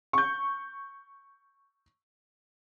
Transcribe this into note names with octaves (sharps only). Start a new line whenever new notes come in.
C#6 G6